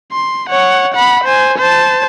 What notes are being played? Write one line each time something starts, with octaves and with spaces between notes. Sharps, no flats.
C6
C#5 F#5
F#5 B5
C5 G#5
C5 A5